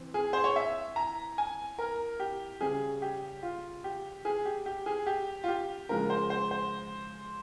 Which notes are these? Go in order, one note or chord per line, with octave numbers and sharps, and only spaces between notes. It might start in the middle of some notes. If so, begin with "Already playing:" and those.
Already playing: E3 C4
G#4
C5
C#5
E5
A#5
G#5
A#4
G4
C#3 G3 C#4 G#4
G4
F4
G4
G#4
G4
G4
G#4
G4
F4
G4
C#3 F3 G#3 A#4
C5
C5
C5